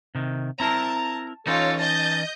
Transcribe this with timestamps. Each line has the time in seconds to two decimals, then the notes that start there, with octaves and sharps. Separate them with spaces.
0.15 C3 D#3
0.60 C4 E4 A#4 A5 A#5
1.47 E3 C#4 D#4 F4 A4 C#5
1.79 D#5 A5 G6